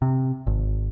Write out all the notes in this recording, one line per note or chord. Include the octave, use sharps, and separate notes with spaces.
C3
G#1